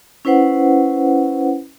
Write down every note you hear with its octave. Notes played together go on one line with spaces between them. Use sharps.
C#4 E4 B4 C5 F#5